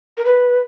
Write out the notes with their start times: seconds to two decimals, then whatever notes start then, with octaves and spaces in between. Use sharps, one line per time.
0.17 A#4
0.25 B4